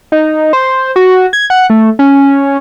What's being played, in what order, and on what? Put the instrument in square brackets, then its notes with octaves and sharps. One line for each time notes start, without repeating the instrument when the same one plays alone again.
[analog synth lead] D#4
C5
F#4
G#6
F#5
A3
C#4